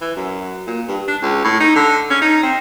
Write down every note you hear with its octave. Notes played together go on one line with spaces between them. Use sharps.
E3
F#2
A#2
G2
D4
C#2
A2
D#4
D3
C#4
D#4
C4